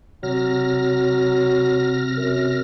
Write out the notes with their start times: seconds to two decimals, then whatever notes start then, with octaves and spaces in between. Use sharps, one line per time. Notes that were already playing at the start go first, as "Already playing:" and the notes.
0.23 C3 F#3 F6 A#6
2.17 F#2